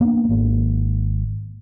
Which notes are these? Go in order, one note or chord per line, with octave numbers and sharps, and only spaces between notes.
A#3 B3 C#4 D4
G#1 A#3